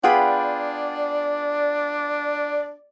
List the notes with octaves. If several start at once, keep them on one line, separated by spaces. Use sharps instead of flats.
B3 D4 F4 G#4 D5 F#5 G5 B5